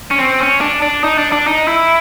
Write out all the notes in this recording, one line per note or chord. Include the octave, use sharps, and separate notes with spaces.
C#4
C4
C#4
D4
D4
D#4
D4
D4
D#4
E4